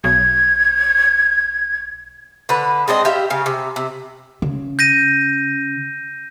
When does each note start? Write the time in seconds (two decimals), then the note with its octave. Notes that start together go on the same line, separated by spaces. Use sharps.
0.04 B1 G#6
2.49 D3 B4
2.88 G#3 C4 D4 D#5
3.05 G4 E5 F5
3.30 C#3 F5
3.46 C3
3.76 C3
4.42 C#3
4.79 G6 A#6 D#7